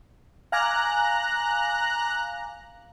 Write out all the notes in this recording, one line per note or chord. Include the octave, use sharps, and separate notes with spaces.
F5 G#5 A#5 D6 F#6